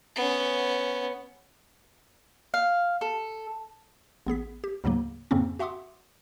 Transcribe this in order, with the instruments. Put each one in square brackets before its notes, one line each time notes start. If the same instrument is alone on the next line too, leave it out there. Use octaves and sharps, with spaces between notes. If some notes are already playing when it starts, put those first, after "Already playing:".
[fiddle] B3 C#4
[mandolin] F5
A4
[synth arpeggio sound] A1 B3 G#4 B6
G4
D2 G#2 C#3 F#3 A#3
F2 G#2 C#3 A#3 C4 C#4
F#4 E5 F#5 C6 D6 D#6